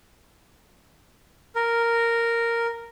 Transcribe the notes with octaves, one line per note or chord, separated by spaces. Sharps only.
A#4